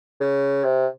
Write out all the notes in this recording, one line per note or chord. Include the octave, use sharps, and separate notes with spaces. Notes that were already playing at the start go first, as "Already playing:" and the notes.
C#3
C3